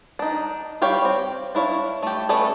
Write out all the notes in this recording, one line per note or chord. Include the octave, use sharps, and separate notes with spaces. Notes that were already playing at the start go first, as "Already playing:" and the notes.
D4 D#4
G3 G4 C#5 F5
C4
D4 E4 C#5 F5
A3 G4
A3 C#4 A4 B4 D5